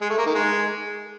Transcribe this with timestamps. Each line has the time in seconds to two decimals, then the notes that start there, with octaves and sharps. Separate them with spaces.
0.02 G#3
0.10 A3
0.18 A#3
0.26 D#3
0.35 G#3